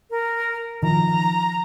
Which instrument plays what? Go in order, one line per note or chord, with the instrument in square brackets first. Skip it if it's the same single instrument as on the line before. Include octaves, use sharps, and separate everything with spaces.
[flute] A#4
[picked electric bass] D#3 F3 [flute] A#5